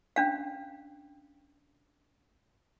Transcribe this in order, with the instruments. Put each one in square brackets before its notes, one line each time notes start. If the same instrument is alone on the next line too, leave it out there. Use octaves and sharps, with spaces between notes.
[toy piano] C#4 D4 F5